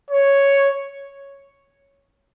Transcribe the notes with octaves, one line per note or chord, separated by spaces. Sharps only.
C#5